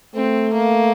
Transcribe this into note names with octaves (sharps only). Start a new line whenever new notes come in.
A3 C4
A#3